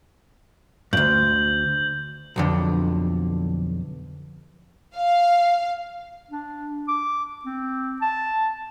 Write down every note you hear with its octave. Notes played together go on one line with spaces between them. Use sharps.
D2 G2 G6 F#7
B1 F2 D3
F5
D4
D6
C4
A5